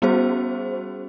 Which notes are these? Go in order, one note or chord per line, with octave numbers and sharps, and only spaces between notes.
G3 B3 C#4 F#4 G#4 C5